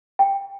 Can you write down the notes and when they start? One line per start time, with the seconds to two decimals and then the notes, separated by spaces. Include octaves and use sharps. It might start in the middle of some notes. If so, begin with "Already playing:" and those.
0.19 G5